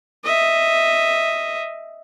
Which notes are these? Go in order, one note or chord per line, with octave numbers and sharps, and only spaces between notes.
D#5 E5